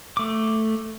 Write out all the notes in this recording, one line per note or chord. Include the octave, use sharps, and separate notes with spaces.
A3 D6